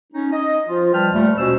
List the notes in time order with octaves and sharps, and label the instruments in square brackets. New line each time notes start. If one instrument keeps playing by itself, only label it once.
[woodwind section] C#4 D#4
D#5
F3 F4
F3 G3 B4 G5 A5 F6
D#2 A#2 G3 A3
B2 G#3 C#4 F#4 C5 E6